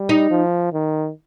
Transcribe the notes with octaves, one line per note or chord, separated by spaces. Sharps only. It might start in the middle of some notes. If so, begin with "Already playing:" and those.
Already playing: G3
D#4
F3
D#3